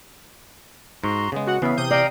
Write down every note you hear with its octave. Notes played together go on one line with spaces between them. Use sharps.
G#2 F#4 A#5 C6
C#3 G#3 B3
F#4 F#5
C#3 E3 B3 E5 F5
C3 D#6 G6
D5 F5 G5 A#5